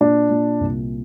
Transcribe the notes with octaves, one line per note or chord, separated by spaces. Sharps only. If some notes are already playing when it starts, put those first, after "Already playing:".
A#2 D4
A#2
C2